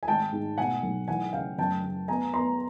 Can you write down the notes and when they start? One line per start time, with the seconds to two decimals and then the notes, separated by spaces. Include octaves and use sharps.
0.03 G#5
0.08 G#1 G5 A5
0.32 G#2
0.57 B2 F#5 G#5
0.83 B1
1.08 E3 F#5 G#5
1.33 C#3 F5 G5
1.58 F#2 G5 A5
1.84 C#3
2.08 B3 G#5 A#5
2.34 B3 A#5 C6